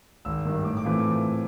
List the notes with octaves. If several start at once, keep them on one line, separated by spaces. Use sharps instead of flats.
G#1 E6
G2 D#3
A2 D6
D6
E3 A3 C4 F4